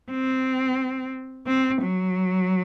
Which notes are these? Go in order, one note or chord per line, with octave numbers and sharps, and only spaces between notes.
C4
C4
F#3